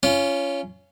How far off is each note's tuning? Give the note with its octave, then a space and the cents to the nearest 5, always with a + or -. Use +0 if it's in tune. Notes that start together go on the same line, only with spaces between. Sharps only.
C#4 +10 F4 -25